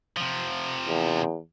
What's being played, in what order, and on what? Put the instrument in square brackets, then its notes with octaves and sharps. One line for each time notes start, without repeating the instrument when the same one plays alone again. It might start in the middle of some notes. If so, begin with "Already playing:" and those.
[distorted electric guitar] C3 F3
[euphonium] E2